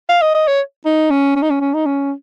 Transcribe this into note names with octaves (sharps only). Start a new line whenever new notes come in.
F5
D#5
D#5
C#5
D#4
C#4
C#4
D#4
C#4
C#4
D#4
C#4